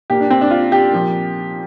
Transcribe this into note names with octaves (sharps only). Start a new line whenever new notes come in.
A#2 A#3 G4
D4
C4
D4
F4
G4
A#2 F3 A#3